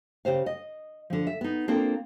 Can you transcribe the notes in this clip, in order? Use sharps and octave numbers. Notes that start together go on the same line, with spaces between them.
C#3 G4 C5 F5
D#5
D3 F3
E5
B3 D#4
A#3 C4 D4 F4 A4